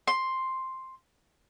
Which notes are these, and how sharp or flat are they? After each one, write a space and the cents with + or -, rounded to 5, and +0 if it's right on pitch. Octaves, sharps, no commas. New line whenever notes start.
C6 +5